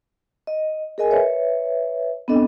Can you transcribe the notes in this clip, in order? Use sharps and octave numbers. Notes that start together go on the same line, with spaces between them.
D#5
G#4 A#4 D#5 G#5
B4 C#5 E5
B3 C4 D4 A4 D#5